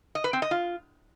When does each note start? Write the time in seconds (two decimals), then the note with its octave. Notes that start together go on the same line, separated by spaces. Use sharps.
0.15 D#5
0.24 B4
0.33 C4
0.42 D#5
0.51 F4